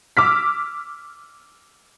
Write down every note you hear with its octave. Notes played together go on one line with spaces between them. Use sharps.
D6 E6 F6 B6